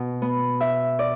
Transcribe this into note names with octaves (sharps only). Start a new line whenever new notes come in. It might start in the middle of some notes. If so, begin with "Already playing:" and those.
Already playing: B2
B3
E5
D5